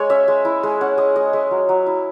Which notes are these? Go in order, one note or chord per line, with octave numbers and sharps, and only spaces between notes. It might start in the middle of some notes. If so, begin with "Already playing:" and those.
Already playing: G#3 C#5
C#4 E5
G#3
E4
G#3
C#4 F#5
G#3 D#5
G#3 D#5
G#3 E5
F#3
F#3
E4